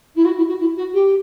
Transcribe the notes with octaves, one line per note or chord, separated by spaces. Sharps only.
E4
F#4
E4
F#4
E4
F#4
G4